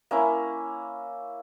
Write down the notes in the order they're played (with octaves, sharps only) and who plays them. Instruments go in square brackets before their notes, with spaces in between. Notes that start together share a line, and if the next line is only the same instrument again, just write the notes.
[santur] A#3 C#4 E4